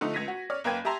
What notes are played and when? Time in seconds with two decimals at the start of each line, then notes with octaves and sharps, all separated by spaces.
0.01 D3 F3 A3 D#4
0.14 C#2 G#6 A#6 B6 D#7
0.28 F#4
0.50 C#5 D5 F6
0.64 F#1 A#3 B4 G5 G#6 D#7
0.85 G4 E5 A5 A#5 C6